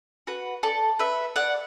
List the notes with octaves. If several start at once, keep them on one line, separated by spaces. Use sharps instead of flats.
F#4 B4
A4 D5
B4 E5
D5 F#5